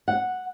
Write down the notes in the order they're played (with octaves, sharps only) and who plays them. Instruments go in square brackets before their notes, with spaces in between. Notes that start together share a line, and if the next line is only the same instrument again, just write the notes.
[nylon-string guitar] F#5